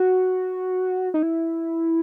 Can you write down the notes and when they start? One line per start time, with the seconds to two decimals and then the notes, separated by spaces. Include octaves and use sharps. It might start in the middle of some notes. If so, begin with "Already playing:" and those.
Already playing: F#4
1.14 D#4
1.23 E4